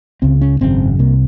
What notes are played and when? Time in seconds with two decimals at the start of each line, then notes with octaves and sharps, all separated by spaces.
0.22 C#2 C#3 C4
0.41 C#4
0.61 G#1 F#2 C#3 C4
0.99 C2 C3 A#3